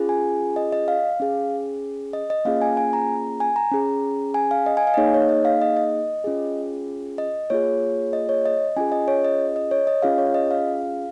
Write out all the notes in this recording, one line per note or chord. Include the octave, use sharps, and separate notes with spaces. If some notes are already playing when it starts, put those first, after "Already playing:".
Already playing: C#4 F4 G#4
G#5
D#5
D#5
F5
C#4 G#4
D#5
D#5
A#3 C#4 F4 G#4 F5
G#5
G#5
A#5
G#5
A#5
C#4 G#4
G#5
F5
D#5
G#5
F5
D#5
A#3 D#4 G#4 C#5
C#5
D#5
F5
D#5
D#5
C#4 F4 G#4
D#5
A#3 F4 G#4 C#5
D#5
C#5
D#5
C#4 F4 G#4 G#5
D#5
C#5
D#5
D#5
C#5
D#5
C#4 F4 G#4 F5
C#5
D#5
F5